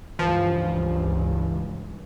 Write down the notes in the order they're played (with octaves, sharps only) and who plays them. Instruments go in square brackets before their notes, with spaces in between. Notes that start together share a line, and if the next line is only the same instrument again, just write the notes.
[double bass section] C#2 G2 [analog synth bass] E3 [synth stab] F3